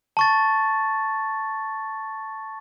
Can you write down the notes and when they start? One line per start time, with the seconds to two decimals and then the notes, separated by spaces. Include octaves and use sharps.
0.17 A5 C#6 A6